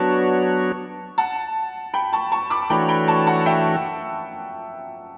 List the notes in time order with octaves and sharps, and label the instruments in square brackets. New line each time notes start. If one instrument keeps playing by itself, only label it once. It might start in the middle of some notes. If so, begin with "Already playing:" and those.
Already playing: [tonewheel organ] F#3 B3 D4 F#4 C#5 [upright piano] A5 C#6
[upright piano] F#5 A5
G5 B5
A5 C#6
A5 C#6
B5 D6
[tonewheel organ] E3 A3 D4 F#4 C#5 [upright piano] G5 B5
[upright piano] G5 B5
A5 C#6
F#5 A5
E5 G5